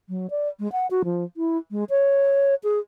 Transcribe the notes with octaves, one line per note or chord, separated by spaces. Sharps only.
F#3
D5
G#3
F#5
F#4
F3
E4
G#3
C#5
G#4